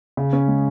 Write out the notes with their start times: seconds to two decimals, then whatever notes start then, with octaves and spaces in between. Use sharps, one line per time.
0.17 C#3
0.33 C#4
0.48 G#3